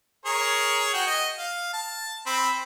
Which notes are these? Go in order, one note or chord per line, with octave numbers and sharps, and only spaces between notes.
G#4 A#4 C#5
F#4 G5
D#5
F5
A5
C4 B5